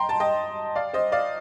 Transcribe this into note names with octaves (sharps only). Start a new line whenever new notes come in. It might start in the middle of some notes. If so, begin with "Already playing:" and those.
Already playing: G5 A#5 C6
A5
D#5 G5
D5 F5
C5 D#5
D5 F5